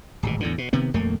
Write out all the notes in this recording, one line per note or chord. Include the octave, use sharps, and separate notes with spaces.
D1 G#1 B2
E2 A2 D3
B2
C3 D#3 B3
D#1 F2 A3 A#3